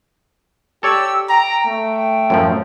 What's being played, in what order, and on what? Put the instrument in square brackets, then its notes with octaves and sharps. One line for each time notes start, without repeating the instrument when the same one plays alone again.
[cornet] G4 [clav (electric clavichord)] A4 C#5 D5 [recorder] E6
[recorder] G5 [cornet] A#5
[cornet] A3
[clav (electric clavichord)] F#2 A2 F3